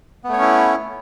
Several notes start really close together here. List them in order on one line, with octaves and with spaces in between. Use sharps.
B3 A3 C#5 C#4 E4